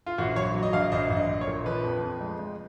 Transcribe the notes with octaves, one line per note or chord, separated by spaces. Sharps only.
F4
A#1 F#4
F#3 C#5
F#3
D#5
A#1 F5
A#1 D#5
A#1
D#5
A#1
C#5
A#2
F3 B4
F2
F2
G#3
G#3